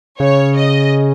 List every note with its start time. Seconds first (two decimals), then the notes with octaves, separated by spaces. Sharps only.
0.20 C#3 C#5
0.57 D#5